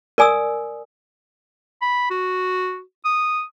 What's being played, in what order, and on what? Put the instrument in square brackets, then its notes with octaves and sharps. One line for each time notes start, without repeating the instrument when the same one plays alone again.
[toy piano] A#4 D5 G#5 D#6 E6
[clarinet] B5
F#4
D#6